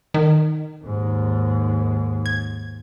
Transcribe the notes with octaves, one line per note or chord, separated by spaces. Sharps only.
D#3
D#2 G#2
G#6